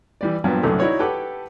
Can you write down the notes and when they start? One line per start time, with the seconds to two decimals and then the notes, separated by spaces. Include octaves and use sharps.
0.21 E3 G3 D5
0.44 G2 A#2 F3 F#3 B3
0.63 C2 F#2 D3 A3
0.79 D#4 E4 F#4 C#5 D5
0.99 G4 A4 B4 F#5 D6